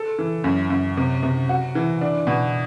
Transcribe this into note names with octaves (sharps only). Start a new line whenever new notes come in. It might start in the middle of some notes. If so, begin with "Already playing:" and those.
Already playing: A4
E3
F#2
F#2
C3
C3
F#4
E3
D4
B2